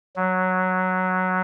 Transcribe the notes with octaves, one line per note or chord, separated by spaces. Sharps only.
F#3